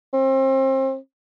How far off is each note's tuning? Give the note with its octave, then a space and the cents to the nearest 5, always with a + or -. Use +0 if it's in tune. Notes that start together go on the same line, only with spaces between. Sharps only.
C4 +30